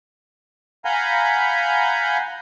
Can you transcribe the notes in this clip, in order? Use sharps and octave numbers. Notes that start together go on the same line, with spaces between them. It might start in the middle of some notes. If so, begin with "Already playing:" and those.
F5 F#5 G#5 A#5 B5 G6